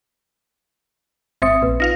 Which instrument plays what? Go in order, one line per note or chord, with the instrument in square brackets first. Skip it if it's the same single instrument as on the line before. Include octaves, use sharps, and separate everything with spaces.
[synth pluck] G#1 C4 C#7 [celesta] E5 D#6
[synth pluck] A#1 [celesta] B4
[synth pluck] D#4 F4 F5 [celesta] A#6